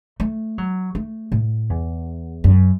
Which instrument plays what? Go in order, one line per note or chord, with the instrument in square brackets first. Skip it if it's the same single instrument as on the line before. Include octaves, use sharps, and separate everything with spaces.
[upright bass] A3
F#3
A3
A2
E2
F#2